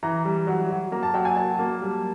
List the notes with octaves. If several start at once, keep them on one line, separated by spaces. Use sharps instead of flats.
E3 A#5
G3
F#3
F#3
A#3 A#5
A5
F#3 G5
G#5
F#3 A5
A#3
G3